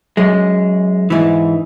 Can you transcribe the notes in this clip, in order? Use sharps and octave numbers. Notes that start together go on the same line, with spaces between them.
F#2 G#3
G#2 E3